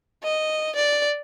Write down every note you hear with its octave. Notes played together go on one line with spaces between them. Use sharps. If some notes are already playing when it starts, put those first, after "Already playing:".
D#5
D5